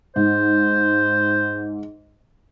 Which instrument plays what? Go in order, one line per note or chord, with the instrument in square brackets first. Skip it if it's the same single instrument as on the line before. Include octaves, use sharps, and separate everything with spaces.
[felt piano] G#2 [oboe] C5